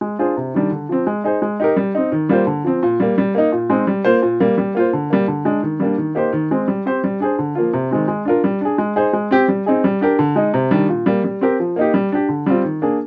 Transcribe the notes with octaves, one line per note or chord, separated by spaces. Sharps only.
G#3
D4 F4 G#4 C5
C3
D#3 G3 D4
D3
F3 C4
G#3
D#4 G#4 C5
G#3
D#4 G4 A#4
G3
C4 D#4
D#3
G3 A#3 F4 C5
D3
F3 C4
A#2
G3 A#3
G3
A#3 D#4
A#2
G#3 C4 D#4
G3
A#3 F4 C5
A#2
G3 A#3
G3
A#3 F4 C5
D3
G3 A#3
D3
G#3 D4
D#3
G3 A#3 D4
D#3
A#3 D#4 G4 C5
D#3
G#3 C4
G3
C4 G4 C5
G3
D4 G#4 C5
D3
F3 A#3 F4
C3
D#3 G#3 C4
G#3
D4 F4 A#4
G3
D4 G#4
G#3
D#4 G#4 C5
G#3
C4 G4
G3
C4 D#4 G#4
G3
D4 G4 A#4
D3
G#3 D#4
C3
D#3 G3 D4
A#2
G3 A#3
G3
C4 G4 A#4
F3
A#3 D#4 G4
G3
D4 G4
D3
G3 C4 F4
D#3
A#3 D4 G#4